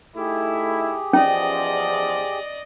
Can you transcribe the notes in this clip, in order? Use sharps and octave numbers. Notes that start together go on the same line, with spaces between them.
A3 D#4 E4 G4 G#4
E2 F3 C#4 D5 D#5